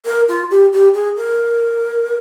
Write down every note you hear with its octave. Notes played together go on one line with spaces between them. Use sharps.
A#4
F4
G4
G4
G#4
A#4